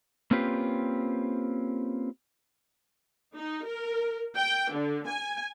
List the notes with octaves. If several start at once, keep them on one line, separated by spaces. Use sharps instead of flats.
A#3 C4 C#4 F4 G4 B4
D#4
A#4
G5
D3
G#5